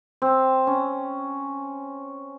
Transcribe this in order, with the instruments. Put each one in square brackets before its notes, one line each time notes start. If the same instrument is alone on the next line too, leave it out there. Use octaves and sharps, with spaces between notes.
[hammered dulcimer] C4
C#4